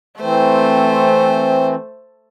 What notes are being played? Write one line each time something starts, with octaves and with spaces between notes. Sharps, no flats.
E3 A3 C4 C5